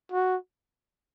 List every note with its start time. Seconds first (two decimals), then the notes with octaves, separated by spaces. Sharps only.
0.12 F#4